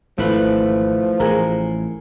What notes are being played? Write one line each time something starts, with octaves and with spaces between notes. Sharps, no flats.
G#1 F3 A3 E4 B4
A1 A2 G#4 A#4